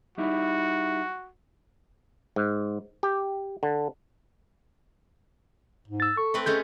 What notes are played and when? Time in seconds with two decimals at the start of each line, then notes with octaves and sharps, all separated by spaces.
0.18 G3 D#4 E4 F#4
2.36 G#2
3.03 G4
3.63 D3
5.88 G#2
6.00 E6 A6
6.17 A4 C#6
6.34 A3 C4 B4
6.46 G#3 A3 C#4 G6